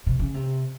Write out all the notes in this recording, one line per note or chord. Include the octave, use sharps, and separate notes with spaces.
C3
C#3
C3